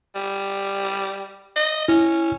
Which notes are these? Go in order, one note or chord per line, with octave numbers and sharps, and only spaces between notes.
G3
D#5
C#4 E4